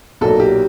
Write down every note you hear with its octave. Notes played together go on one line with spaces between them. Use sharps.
B1 A#2 F#3 A4
G4